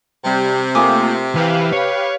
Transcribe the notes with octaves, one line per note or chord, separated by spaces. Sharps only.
C3 G3
A3 A#3 F4 G#5 D6 D#6
E3 G4 B4 F5
C#5